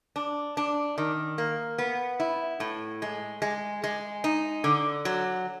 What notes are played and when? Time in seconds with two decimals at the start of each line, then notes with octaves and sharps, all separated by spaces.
0.16 D4
0.57 D4
0.98 D#3
1.38 A#3
1.78 B3
2.20 E4
2.60 A2
3.02 G#3
3.42 G#3
3.84 G#3
4.24 D#4
4.64 D3
5.05 F#3